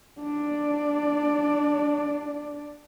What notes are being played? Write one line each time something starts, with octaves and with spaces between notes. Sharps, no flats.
D4 D5